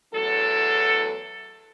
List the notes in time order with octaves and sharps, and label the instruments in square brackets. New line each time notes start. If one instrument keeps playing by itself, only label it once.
[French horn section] E2 A2 F#3 A4